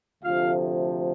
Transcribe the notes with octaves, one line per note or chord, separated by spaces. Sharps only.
D2 C3 F3 A3 F4 F5